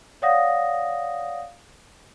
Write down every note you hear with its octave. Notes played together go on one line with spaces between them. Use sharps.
C#5 D5 F5 F#5 D#6 A#6